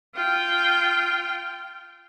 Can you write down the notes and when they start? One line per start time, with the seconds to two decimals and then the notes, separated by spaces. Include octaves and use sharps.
0.14 F4 G5